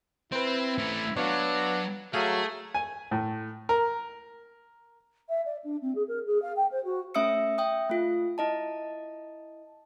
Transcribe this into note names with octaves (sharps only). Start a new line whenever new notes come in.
C4 E4 B4 C5
A3 C#4
F#3 B3 D4 C#5 F5
F#3 A3 G#4 F5 A#5
G#5
A2
A#4
E5
D5
D4
C4
G#4
A#4
G#4
F5
G5
C5
F#4
A3 C#4 E5 D#6 E6 C#7
E5 G5 D#6
A3 F4
E4 D#5 A5